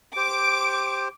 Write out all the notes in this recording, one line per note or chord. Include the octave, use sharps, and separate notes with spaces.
G4 C5 D6 D7